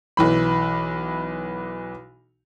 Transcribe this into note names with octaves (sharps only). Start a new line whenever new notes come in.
B1 E3 B5